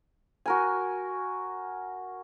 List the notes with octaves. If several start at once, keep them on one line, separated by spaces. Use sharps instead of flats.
F#4 A#4 G#5